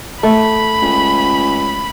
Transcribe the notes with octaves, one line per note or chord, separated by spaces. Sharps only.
A3 B5
C#2